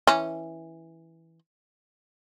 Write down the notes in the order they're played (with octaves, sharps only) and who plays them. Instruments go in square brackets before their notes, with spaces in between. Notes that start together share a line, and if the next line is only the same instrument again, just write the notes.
[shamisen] E3 C#4